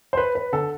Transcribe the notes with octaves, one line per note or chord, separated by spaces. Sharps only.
C5
B4
B4
D3 A4